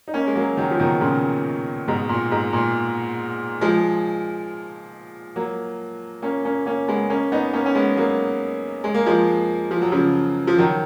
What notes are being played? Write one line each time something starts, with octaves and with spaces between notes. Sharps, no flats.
D#4
A#3 C#4
G#3
F#3 A#3
D#3 F#3
F3
B2 D#3
A#2 C#3
G#2 B2
A#2
G#2
A#2
F3 G#3
F#3 A#3
A#3 C#4
A#3 C#4
A#3 C#4
G#3 B3
A#3 C#4
B3 D#4
A#3 C#4
C#4
G#3 B3
F#3 A#3
G#3
A#3
F3 G#3
F3
F#3
C#3 F3
F3
D#3 F#3